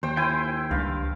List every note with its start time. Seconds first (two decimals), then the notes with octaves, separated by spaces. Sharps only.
0.03 D#2 C5 G5
0.17 E4 G5 G#5
0.71 C#2 G2 F5